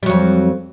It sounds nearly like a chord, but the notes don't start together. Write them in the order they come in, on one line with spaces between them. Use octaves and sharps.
G3 F#3 F2